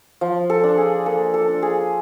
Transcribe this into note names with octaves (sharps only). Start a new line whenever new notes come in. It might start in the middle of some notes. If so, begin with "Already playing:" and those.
F3
A4
D4
G#4
A#3 A4
A4
D4
G#4